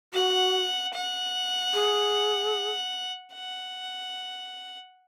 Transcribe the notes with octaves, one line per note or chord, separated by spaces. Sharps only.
F#4 F#5
F#5
G#4
F#5